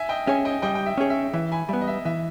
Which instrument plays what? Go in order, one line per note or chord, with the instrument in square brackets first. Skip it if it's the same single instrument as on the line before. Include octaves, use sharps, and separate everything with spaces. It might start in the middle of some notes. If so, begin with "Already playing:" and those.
Already playing: [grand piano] E5 G#5
D#5 G5
[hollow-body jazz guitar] C#4 G#4 C#5 [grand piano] E5 G#5
[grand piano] D#5 G5
[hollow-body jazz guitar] G3 [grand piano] D#5 G5
[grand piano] G5
E5
[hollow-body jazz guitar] C#4 G#4 C#5
[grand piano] E5
[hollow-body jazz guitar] E3 [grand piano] E5
[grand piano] G#5 B5
[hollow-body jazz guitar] G3 B3 [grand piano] E5
[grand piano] D#5
E5
[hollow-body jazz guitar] E3 [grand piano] E5